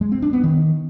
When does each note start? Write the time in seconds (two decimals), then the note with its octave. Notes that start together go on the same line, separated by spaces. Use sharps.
0.01 G#3
0.12 C4
0.22 D4
0.33 B3
0.44 D#3